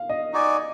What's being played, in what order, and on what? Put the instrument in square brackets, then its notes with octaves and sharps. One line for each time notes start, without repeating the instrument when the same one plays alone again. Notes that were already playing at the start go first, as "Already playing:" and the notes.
Already playing: [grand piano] F5
D#5
[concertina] D#4 F#4 D5 G#5